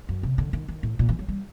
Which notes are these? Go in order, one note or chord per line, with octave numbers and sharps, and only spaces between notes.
F#2
C3
D3
D#3
D#3
A2
A#2
E3
F#3
G3